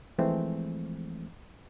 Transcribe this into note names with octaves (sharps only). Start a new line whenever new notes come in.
E3 F3 G#3 A3 C4